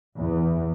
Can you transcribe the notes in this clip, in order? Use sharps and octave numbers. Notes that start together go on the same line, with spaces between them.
E2